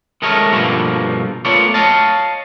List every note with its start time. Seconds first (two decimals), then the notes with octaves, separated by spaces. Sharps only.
0.22 D#3 G#3 A3 C#4 A#4
0.51 G2 B2 D3 F3 A#3
1.45 A3 B3 F4 A#4 C#5 D5
1.74 C#5 D#5 F5 A5